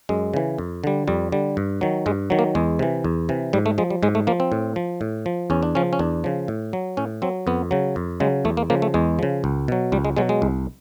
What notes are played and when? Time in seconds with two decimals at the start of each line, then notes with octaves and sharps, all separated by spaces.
0.09 F#2 G#3
0.34 C#3 E3
0.58 F2
0.84 D3 G3
1.08 F2 G3
1.32 D3 G3
1.57 G2
1.81 D#3 F#3
2.06 G2 G#3
2.30 D#3 F#3
2.39 A#3
2.55 E2 G#3
2.79 C3 E3
3.04 E2
3.29 C3 E3
3.53 G#2 G3
3.66 A3
3.78 F3 G#3
3.90 G3
4.03 G#2 G#3
4.15 A3
4.27 F3 A#3
4.40 C4
4.52 A2
4.76 F3
5.01 A2
5.26 F3
5.50 E2 C#4
5.63 D4
5.75 C#3 F3 C#4
5.93 C#4
5.99 E2 D4
6.24 C#3 F3
6.48 A2
6.73 F#3
6.97 A2 C#4
7.22 F#3 C4
7.47 F2 B3
7.71 C#3 F#3
7.96 F2
8.20 C#3 F#3 G#3
8.45 E2 A3
8.57 A#3
8.70 C#3 F3 A#3
8.82 A3
8.94 E2 G#3
9.19 C#3 F3
9.44 C#2
9.68 B2 F#3
9.92 C#2 G3
10.05 G#3
10.16 B2 F#3 G#3
10.29 G#3
10.42 C2